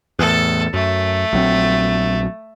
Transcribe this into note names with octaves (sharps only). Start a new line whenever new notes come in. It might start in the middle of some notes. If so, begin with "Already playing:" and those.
E2 A2 A4
F#2 A3
A#1 F#3 C4